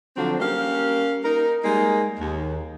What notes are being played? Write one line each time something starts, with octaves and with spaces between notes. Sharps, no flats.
D3 F3 F#3 C4 D4
G3 A#3 C#4 G4 F5
D#4 A#4
G3 G#3 A#3 D#4
D#2